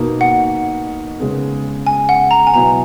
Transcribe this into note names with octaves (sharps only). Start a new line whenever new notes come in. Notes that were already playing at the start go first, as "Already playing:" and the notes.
Already playing: B2 A#3 D#4
F#5
C#3 G#3 B3
G#5
F#5
A#5
G#5
B2 F#3 B3 E4 A#5